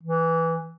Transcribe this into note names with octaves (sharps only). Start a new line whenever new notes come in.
E3